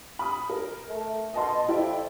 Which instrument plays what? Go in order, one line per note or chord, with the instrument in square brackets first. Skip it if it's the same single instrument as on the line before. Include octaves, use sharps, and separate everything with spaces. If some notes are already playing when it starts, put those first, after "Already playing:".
[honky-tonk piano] B5 D#6
A#4
[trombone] A3
[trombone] B2 [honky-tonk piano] D#5 A5 C6
[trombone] F2 [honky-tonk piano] E4 D5 G5